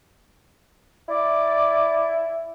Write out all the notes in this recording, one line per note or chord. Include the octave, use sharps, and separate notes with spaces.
E4 D5